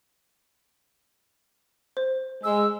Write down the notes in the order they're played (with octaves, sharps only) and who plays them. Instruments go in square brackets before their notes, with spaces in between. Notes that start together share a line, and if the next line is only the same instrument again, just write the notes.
[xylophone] C5
[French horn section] G#3 [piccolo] E6